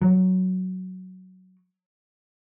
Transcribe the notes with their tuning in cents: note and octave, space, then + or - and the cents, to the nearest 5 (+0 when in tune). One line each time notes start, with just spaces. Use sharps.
F#3 +5